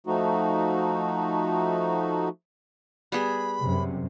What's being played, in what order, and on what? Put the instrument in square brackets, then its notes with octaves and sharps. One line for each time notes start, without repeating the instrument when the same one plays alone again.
[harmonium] F3 A3 D#4 F#4
[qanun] G3 B3 G#4 [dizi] B5
[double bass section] F#2 C3